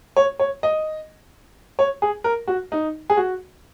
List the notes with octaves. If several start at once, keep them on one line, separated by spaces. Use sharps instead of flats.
C#5
C#5
D#5
C#5
G#4
A#4
F#4
D#4
G#4
F#4